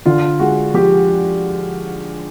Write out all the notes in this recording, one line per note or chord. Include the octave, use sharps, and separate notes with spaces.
D3 F4
G#3 F#4
F3 G4